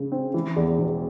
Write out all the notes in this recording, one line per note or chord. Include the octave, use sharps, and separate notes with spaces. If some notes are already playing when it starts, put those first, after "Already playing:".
Already playing: C#3
C4
E3
E2
E1